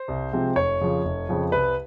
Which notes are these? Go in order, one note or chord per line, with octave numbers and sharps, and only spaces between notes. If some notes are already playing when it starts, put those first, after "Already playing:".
Already playing: C5
C2
C3 F3 G#3 C4
F1 C#5
F2 C#3 F3
F1
F2 C#3 F3
C2 B4